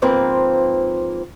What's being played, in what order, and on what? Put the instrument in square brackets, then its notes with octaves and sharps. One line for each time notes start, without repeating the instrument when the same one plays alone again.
[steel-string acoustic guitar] G#2 F3 A#3 C4 B4